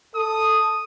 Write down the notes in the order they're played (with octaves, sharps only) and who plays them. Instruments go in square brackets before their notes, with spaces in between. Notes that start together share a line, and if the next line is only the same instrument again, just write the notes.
[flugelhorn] A4 [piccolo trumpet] D#6